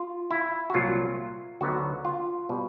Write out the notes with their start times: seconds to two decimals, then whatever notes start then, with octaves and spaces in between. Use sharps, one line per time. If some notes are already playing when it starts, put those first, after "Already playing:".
Already playing: F4
0.31 E4
0.70 F#4
0.74 C2 A#2 F#3 F4
1.61 D2 D3 F#3 B3 D#4 F#4
2.05 F4
2.49 B2 G3